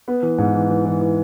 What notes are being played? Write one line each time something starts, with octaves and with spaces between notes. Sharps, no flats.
B3
E3
G#2
E3
E3
E3
E3